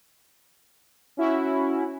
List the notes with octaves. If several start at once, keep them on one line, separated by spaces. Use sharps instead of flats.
C#4 E4 F#4